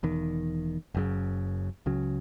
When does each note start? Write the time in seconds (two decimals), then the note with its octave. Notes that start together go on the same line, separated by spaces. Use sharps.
0.03 E1 E2 D#3
0.95 F#1 F#2 C#3
1.86 C#2 C#3 F#3